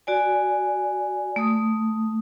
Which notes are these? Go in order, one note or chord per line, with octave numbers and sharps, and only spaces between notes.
F#4 D5 G#5
A3 D#6